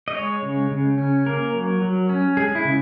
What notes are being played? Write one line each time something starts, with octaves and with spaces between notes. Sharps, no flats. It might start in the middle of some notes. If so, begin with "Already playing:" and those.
D#5
G#3 C#5
C#3
C#3
C#4
A#3 A#4
F#3
F#3
C#4
G#3 G#4
E4
C#3